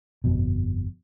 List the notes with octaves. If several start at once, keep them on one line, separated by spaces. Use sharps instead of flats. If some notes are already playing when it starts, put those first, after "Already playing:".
G1 F2 B2